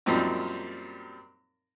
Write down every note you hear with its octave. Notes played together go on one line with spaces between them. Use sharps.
F#2 A#2 F3 G3 C4 D#4